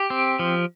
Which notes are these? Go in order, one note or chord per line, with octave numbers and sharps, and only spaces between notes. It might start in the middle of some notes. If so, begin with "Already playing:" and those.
Already playing: G4
C4
F3